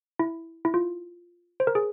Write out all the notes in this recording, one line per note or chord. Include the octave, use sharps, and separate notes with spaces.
E4
E4
F4
C5
A#4
G#4